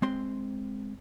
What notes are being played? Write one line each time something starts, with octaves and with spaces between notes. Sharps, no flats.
G#3 C4 C6